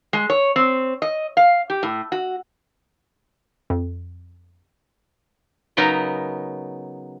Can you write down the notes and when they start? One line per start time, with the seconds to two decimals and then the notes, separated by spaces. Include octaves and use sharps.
0.13 G#3
0.30 C#5
0.56 C4
1.02 D#5
1.37 F5
1.70 G4
1.83 A2
2.12 F#4
3.70 F2
5.77 C#3 F#3 B3 D#4 A#4